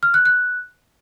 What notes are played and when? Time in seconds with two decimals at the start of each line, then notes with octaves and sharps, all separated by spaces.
0.03 F6
0.14 F#6
0.26 F#6